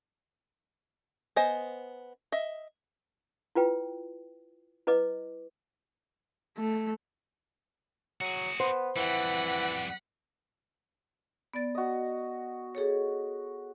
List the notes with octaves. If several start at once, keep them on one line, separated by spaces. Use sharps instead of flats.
B3 C5 D#5 G#5
D#5 E5
E4 F4 B4 G5
E4 B4 D#5 D6
A3
F#3 F#4 G#4
B3 C5
F2 E3 G3 F#5 B6
B3 D5 A6
F#4 D#5
G#4 A4 C#5